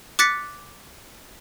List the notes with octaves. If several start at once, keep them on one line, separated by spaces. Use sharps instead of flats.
D6 F#6 A6 B6 C#7